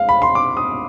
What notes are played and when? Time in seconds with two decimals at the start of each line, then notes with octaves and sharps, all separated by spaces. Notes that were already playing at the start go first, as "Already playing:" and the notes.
Already playing: G#3 F5
0.09 B5
0.22 C6
0.35 D6
0.57 D#6